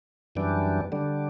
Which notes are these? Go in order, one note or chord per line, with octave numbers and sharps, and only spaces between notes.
F#2 E3 G3 D4
D3 G3 D4